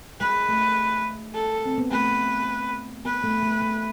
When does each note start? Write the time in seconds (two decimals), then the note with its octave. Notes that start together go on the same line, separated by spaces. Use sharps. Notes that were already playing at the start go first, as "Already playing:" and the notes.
0.21 G#3 B4
0.49 A3
1.34 A4
1.66 C4
1.78 B3
1.91 A3 B4
3.05 B3 B4
3.24 A3
3.43 A3
3.62 A3